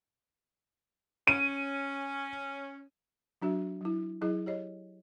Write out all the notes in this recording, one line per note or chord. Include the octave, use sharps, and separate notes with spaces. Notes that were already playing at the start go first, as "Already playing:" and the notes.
C#4 D#7
F#3 D4 F#4 E5
F#3 E4
F#3 E4 G#4 D#5
G4 C#5 D#5